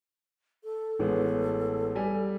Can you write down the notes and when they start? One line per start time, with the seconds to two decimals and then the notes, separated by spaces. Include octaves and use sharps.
0.64 A4
0.99 A1 G#3 B3
1.96 G3 G#5